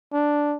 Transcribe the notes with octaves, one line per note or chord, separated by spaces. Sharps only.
D4